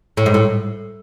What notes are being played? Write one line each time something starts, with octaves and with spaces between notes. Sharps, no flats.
A2
G#2
A2